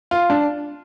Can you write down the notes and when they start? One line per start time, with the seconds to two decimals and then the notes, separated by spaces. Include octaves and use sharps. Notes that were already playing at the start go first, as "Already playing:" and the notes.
0.11 F4
0.30 D4